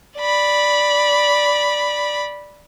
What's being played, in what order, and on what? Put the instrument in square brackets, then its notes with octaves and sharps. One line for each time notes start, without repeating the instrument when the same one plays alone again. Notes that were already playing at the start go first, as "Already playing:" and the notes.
[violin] D5 B5